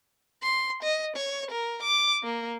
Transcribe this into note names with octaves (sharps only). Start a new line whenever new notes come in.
C6
D#5
C#5
A#4
D6
A#3